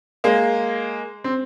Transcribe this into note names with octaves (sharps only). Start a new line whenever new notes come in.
G#3 A#3
C4